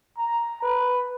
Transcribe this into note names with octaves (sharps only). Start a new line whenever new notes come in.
A#5
B4